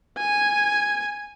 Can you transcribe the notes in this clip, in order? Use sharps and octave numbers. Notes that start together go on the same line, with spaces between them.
G#5